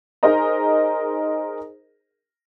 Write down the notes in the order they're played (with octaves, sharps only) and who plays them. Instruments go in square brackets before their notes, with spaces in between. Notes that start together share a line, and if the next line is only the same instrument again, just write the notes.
[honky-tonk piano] D#4 G#4 A#4 C5 D#5 A#5